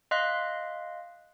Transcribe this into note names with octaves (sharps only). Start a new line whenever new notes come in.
D#5 F5 C6 F#6 B6